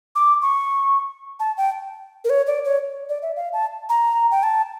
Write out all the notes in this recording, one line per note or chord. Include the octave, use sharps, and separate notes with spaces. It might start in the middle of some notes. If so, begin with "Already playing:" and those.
D6
C#6
A5
G5
A#4
C#5
D5
C#5
D5
E5
F5
A5
A#5
G5
A5